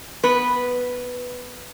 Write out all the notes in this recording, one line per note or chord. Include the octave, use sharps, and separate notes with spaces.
B3 B4